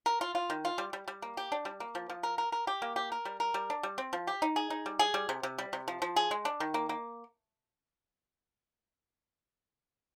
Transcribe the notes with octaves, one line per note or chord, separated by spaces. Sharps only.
A#4
F4
F4
D#3
F4
G3
G3
G3
A#3
G4
D4
G3
A#3
F3
F3
A#4
A#4
A#4
G4
A#3
G4
A#4
G3
A#4
G3
D4
G3
C4
F3
G4
D#4
G#4
D#4
G3
G#4
G3
C3
C3
G3
C3
F3
F3
G#4
G#3
D4
D#3
A#3
A#3